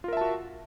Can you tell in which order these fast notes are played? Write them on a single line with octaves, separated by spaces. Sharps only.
F4 A#4 E5 A5 F#4